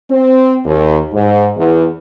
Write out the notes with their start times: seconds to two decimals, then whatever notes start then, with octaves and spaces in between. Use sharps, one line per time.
0.10 C4
0.65 D#2
1.14 G#2
1.57 E2